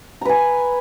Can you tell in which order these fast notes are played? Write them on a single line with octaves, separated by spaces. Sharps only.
A#5 B4 G#5